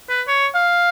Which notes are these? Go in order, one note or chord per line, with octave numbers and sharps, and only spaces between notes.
B4
C#5
F5